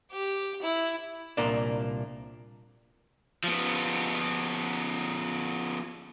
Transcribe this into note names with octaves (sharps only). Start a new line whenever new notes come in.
G4
E4
C2 A#2 A#3 D4
F3 B3